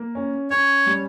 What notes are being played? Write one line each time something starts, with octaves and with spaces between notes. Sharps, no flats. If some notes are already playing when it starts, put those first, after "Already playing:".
Already playing: A#3
C#4
C#4 C#5
G3